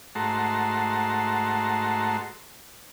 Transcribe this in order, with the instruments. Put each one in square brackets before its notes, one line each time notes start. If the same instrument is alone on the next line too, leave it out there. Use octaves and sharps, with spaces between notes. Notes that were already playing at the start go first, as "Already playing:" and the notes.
[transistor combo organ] G#2 A3 F#4 A5 A#5 C6